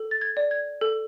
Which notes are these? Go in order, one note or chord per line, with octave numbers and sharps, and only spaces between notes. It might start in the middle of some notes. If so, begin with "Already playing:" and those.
Already playing: A4
A6
G#6
D5
G#6
A4